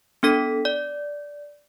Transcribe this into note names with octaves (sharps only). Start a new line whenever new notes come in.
B3 D4 A4 B6
D5